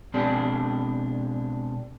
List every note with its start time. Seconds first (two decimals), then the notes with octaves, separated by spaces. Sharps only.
0.14 B2 G#3 C4 D4 G4